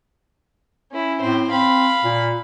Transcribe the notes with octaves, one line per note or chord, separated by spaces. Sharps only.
C#4 E4
A2 C4 C5
C4 F5 B5
A#2